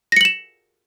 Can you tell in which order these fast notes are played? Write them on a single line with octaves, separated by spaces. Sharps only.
A#6 C#7 F#7 E7